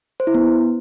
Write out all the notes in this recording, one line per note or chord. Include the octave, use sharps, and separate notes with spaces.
C5
E4
B3